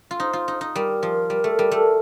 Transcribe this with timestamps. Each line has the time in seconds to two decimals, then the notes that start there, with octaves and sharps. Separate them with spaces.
0.11 F4
0.20 D#4 C5
0.33 F4
0.48 D#4
0.61 D#4
0.75 G3 A#4
1.03 F3
1.30 G3
1.44 A3
1.59 G3
1.71 A3